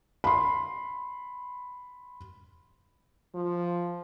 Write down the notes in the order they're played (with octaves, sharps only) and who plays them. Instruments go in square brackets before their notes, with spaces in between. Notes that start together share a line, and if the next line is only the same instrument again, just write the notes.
[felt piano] B5 C6
[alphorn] F3